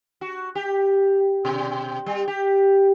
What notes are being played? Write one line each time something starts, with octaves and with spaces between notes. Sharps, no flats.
F#4
G4
B2
G3
G4